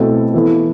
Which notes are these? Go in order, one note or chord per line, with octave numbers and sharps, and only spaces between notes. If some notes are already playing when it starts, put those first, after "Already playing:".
Already playing: B2 A3 C4 E4 A4
E3 B3 E4 A4